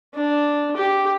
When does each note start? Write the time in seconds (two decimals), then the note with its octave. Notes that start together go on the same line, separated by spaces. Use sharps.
0.15 D4
0.77 G4